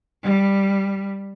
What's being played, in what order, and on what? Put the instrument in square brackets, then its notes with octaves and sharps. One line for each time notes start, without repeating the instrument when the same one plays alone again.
[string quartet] G3